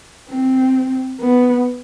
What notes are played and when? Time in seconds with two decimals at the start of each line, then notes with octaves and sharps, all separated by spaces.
0.29 C4
1.21 B3